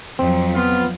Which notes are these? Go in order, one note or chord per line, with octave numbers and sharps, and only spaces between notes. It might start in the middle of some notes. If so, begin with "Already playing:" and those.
F2 F#3 C4
B3 F4